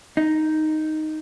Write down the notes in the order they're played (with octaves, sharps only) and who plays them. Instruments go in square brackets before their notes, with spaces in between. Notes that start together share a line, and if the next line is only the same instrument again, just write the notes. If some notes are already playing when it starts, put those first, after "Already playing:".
[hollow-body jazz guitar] D#4